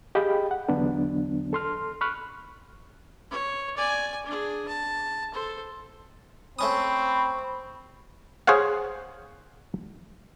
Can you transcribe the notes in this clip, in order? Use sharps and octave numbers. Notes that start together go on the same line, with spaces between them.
G4 G#4 D#5 F5 G5 B5
F#5
E2 D3 F#3 B3 D4
A4 C6 F6
B5 C#6 F6 F#6
C#5
D5 G#5
D4 G#4
A5
A4 C5
A3 C4 C#4 B5 C#6 D#6
G#4 C5 C#5 F5 F#5